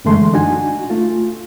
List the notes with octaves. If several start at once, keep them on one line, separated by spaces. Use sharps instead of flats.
F#2 D3 E3 G#3 A3 C6
D4 D#4 F#4 G#5
A3 F4